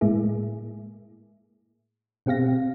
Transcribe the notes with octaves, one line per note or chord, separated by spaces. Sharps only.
A2 G#3 A#3 E4 G#4
B2 C4 G4 F5 A#6